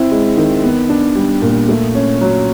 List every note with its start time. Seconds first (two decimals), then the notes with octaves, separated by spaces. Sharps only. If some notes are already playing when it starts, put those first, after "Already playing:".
Already playing: C4 E4
0.11 G#3
0.37 D#3
0.63 B3
0.89 D4
1.15 G3
1.42 A#2
1.69 A3
1.95 C#4
2.21 F#3